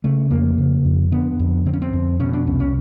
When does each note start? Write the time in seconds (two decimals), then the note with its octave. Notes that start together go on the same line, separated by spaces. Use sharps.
0.04 C#3 A3
0.31 F2 A#3
0.58 C#3
0.85 F2
1.11 D3 B3
1.39 F2
1.66 D3 C4
1.73 C#4
1.82 C4
1.93 F2
2.20 B2 C#4
2.33 D4
2.47 C2 C#4
2.60 C#4